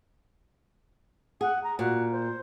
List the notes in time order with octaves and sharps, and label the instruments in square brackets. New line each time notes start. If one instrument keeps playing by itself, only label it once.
[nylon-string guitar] G#4 [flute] F#5
[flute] A#5
[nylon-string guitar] A#2 [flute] F#4
[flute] C5